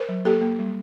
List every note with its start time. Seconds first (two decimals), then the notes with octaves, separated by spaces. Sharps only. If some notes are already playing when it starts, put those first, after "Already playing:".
Already playing: A#4 C5
0.09 F#3
0.25 A#3 G4 A4
0.41 A#3
0.59 G3